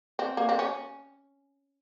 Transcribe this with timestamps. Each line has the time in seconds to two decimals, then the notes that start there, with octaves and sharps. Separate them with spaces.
0.19 C4
0.37 A#3
0.49 C4
0.59 C#4